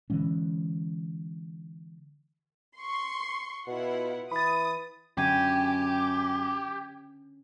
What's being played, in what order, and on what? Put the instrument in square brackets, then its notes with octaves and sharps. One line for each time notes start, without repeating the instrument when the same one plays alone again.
[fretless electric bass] D3 E3 G#3 C#4
[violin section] C6 C#6
[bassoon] B2 [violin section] E4 F4 F#5
[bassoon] E3 [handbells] B5 A6 [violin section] D#6
[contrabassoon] F#2 [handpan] D3 C#4 [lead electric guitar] G4 [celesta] G5 G#6 D#7